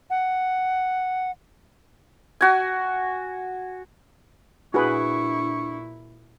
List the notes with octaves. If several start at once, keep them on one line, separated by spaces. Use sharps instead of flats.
F#5
F#4 G#5
A#2 D4 E4 F#4 G#4 B4 C#6